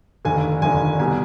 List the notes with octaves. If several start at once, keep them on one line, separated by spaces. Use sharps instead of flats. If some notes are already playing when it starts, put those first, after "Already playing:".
F1 D#2 D3 G#5
F1 D#2 D3 G#5
C2 B2 G3 G#5